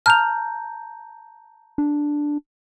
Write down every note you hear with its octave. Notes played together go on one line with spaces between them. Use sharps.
A5 A#5 F6 G6 F7
D4